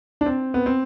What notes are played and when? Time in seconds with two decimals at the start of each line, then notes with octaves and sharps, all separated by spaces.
0.21 D4
0.26 C4
0.54 B3
0.66 C4